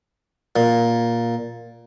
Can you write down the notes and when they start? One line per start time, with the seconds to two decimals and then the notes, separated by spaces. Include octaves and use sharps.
0.56 A#2